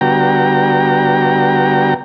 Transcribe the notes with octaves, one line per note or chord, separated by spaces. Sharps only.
D3 G3 B3 F#4 G5 A#5